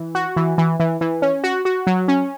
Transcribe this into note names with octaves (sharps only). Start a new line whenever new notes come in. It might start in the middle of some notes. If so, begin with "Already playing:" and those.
Already playing: E3
F#4
E3
E3
E3
E3
C#4
F#4
F#4
F#3
C#4